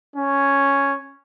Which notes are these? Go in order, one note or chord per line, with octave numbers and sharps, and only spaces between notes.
C#4